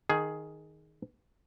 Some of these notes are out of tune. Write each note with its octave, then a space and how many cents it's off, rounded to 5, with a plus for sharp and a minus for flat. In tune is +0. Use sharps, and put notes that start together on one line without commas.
D#3 +0 G#4 +10